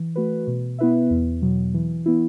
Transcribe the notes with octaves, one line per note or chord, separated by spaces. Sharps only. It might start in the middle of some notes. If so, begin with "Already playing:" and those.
Already playing: E3
A3 F#4 B4
B2
B3 E4 B4 E5
E2
B2 F#3
E3
B3 E4